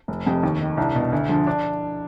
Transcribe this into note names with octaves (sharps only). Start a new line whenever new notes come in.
F1
F2 C3
D#2
D#3
C2 D4
B2
D2
D3 F3
D4